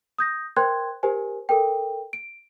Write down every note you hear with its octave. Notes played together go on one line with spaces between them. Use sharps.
D#6 G6 A#6
A#4 C5 G5 C6 F#6 G#6
G4 A#4 C5 G#5
A4 A#4 G5
D7